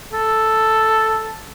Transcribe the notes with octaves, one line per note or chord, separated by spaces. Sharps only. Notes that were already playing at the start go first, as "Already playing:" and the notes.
A4